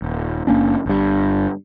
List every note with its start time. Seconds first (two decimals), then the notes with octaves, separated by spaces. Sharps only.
0.02 D#1
0.47 F#1 A#3 C#4 D4
0.86 G1 G2